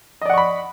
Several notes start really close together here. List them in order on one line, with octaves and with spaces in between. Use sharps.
D#5 D5 F#5 C#6 B5